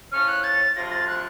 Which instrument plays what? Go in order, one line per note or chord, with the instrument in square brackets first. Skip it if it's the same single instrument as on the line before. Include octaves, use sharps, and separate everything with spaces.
[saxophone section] A2 F3 A3 C#4 [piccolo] F6
[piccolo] F#6
A6
[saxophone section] D2 C3 F3 [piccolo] A#6
[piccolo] A6
F#6